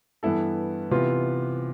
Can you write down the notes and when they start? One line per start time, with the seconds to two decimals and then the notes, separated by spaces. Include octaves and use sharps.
0.23 G2 E3 B3 E4 A4
0.91 C3 E3 B3 F4